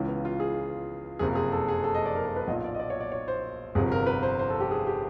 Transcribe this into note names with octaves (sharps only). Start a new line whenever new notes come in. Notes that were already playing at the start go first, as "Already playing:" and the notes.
Already playing: C#2 C#3 E3
B3
F4
G#4
F#1 F2 C3 G#4
G#4
A4
G#4
A4
D#5
D5
A#4
A#4
B4
B1 A#2 D#5
D5
D#5
D5
C#5
D5
C#5
C5
G1 F2 C3 G#4
A#4
B4
C5
C5
A4
G4
G#4
G4